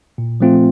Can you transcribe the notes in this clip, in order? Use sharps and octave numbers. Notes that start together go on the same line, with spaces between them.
A#2
F3 A3 C4 F4